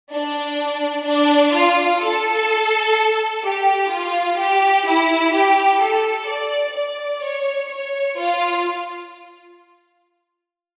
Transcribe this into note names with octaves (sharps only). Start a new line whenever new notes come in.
D4
D4
F4
A4
G4
F4
G4
E4
G4
A4
D5
D5
C#5
C#5
F4